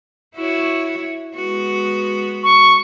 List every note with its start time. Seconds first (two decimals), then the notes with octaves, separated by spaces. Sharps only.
0.35 E4 F#4 C#5
1.35 G#3 B3 F#4
2.44 C#6